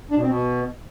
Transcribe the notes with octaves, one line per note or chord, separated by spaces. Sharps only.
D4
B2
C4
B2